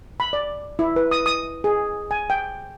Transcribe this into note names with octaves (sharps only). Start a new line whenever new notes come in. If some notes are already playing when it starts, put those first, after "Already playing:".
B5
D5
E4
B4
D#6
D#6
G#4
G#5
G5